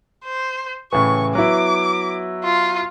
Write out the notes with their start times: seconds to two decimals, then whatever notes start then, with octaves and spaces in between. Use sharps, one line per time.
0.24 C5
0.93 A2 C#3 E3 C#6
1.35 F#3 B3 E4 D6
2.44 F4